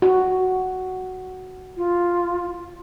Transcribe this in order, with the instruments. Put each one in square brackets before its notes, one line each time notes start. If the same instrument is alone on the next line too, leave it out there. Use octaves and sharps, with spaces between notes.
[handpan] F#4
[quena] F4